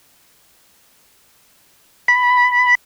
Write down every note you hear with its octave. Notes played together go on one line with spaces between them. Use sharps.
B5